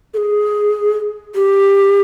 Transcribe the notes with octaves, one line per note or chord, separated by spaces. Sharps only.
A4
G#4
G4